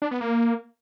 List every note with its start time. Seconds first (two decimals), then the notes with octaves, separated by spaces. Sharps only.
0.02 D4
0.11 B3
0.21 A#3